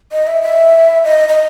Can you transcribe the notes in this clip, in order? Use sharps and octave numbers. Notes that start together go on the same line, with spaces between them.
D#5
E5
E5
D#5
D#5